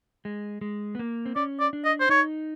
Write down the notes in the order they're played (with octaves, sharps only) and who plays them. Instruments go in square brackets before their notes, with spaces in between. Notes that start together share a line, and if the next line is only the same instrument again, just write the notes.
[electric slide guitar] G#3
G#3
B3
A#3
C4
[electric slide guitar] C#4 [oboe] D5
[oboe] D5
[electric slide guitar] D4
[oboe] D#5
C5
[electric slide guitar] D#4 [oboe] C#5